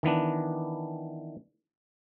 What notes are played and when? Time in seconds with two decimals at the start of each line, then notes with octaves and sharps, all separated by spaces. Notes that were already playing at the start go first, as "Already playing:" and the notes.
0.03 D#3 E3 B3 D4